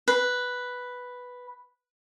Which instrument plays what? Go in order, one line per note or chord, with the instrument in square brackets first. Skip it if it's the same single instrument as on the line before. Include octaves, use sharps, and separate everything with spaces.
[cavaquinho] B4